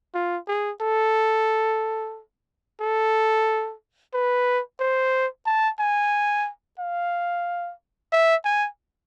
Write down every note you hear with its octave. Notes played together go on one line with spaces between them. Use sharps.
F4
G#4
A4
A4
B4
C5
A5
G#5
F5
E5
G#5